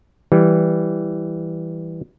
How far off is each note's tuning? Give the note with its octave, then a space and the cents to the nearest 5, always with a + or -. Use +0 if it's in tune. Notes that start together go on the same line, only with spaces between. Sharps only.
E3 +0 G3 +0